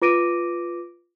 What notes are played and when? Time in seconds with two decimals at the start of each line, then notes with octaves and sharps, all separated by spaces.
0.02 F4 B4 D6 A#6 D7 D#7